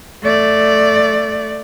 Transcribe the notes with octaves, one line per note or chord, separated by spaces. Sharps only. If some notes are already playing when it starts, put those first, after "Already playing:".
A3 D5